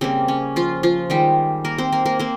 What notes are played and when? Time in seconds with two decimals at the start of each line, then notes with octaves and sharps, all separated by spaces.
0.01 C#3 G3 A#3 C4
0.28 C#4
0.56 F3 F4
0.83 F3 F4
1.10 D#3 G3 G#3 G4
1.65 A#3 A#4
1.78 C4 C5
1.92 A#3 A#4
2.06 A#3 A#4
2.19 A#3 C4 C5